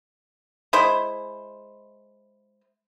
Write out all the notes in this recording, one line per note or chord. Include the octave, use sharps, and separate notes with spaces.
G#3 E4 C5